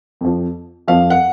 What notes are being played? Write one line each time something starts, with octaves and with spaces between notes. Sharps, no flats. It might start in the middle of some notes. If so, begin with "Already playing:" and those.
F2 F3
F2 F3 F5
F#5